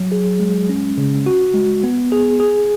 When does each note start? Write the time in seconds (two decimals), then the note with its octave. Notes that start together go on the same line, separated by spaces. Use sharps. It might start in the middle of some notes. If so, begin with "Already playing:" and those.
Already playing: F#3
0.12 G#4
0.40 G#3
0.69 C#4
0.98 C#3
1.26 F#4
1.54 G#3
1.84 B3
2.12 G#4
2.40 G#4